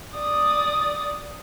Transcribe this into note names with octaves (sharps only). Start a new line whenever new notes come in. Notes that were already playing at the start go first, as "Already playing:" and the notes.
D5 D#6